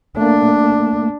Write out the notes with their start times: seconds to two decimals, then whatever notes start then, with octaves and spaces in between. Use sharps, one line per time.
0.17 A3 A#3 D4